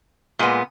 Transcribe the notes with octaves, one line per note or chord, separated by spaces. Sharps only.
A#2 G#3 B3